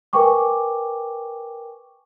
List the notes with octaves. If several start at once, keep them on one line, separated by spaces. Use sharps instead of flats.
A#4 B4 G5 G#5 C#6 D6